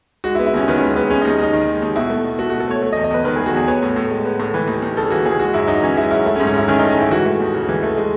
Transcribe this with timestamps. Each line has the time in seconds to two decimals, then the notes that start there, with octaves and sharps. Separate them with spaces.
0.24 G#3 F#4
0.35 E4
0.39 B3
0.46 E4
0.54 D#2 C#4
0.68 D#3 B3
0.75 C#4
0.81 G#3 B3
0.96 B3
1.10 G#3 C#4
1.22 D#4
1.25 D#2
1.39 D#2 D#4
1.53 D#3
1.68 G#3
1.82 D#2
1.96 B2 E4
2.10 A3
2.24 B2
2.39 A3 F#4
2.50 F#4
2.54 B2
2.60 A4
2.68 A3 C#5
2.82 A3
2.93 D#5
2.96 E2
3.04 D#5
3.10 E2 B4
3.24 D#3 B4
3.36 G#4
3.39 A3
3.46 F#4
3.53 E2 G#4
3.68 B3 C#5
3.83 A2
3.96 A2
4.11 G#3
4.25 B3
4.40 A2
4.54 E3 B4
4.67 D#2
4.82 D#2
4.97 C#3 A4
5.10 E3 F#4
5.25 D#2 G#4
5.39 G#3 F#4
5.54 F#2 E4
5.68 F#2 D#4
5.82 E3 C#4
5.97 G#3 E4
6.11 F#2 E4
6.26 A3 E4
6.36 C#4
6.40 G#2
6.47 C#4
6.54 G#2 E4
6.68 D#3 C#4
6.79 D#4
6.83 A3
6.90 C#4
6.98 G#2 E4
7.11 E3 F#4
7.26 A3
7.40 D#2
7.54 C#3
7.69 E3
7.83 A3
7.97 G#3